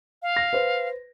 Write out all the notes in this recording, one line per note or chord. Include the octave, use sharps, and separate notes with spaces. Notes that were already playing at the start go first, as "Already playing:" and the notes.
F5
A#6
B4 C5